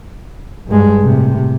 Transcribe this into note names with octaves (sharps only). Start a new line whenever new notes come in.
G2 G#3
A2 C3